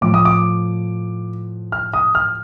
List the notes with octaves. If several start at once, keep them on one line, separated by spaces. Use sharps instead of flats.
A2 F3 D6
D#6
D6
F6
D#6
F6